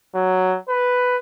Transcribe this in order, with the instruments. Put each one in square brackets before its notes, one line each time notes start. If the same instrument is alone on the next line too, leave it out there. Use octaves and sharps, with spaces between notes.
[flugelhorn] F#3
B4